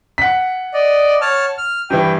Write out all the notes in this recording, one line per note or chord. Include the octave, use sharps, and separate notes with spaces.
F#5 B6
D5 D#5
C#5 A5 F6
F6
G2 E3 G5